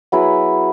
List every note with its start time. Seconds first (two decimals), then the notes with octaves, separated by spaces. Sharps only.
0.12 F#3 B3 E4 G#4